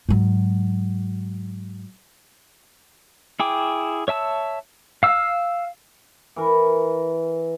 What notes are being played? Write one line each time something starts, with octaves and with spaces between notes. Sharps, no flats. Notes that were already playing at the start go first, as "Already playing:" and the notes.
G#2 F#3
E4 G#4 G5 D6
C#5 E5 A5 E6
F5 E6
E3 A#4